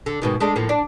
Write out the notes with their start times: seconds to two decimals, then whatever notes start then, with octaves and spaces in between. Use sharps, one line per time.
0.06 D3
0.22 G#2 B2 D#3
0.40 G#3 A3 D4
0.56 A2 F3 A#3
0.69 D4